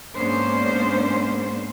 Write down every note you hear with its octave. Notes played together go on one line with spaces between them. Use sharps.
G#2 A#3 B3 C#4 D4 C5